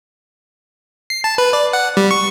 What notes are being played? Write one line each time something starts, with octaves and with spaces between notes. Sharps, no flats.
C7
A5
B4
D5
F#5
G3
C#6